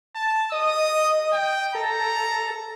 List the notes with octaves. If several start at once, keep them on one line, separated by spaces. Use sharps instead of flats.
A5
D#5 D#6
G5
A4 A#5